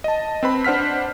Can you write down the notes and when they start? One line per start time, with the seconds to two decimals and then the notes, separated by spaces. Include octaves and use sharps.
0.04 D#5 A5
0.43 C4 B4 B5
0.64 D4 C5 F#5 F6 B6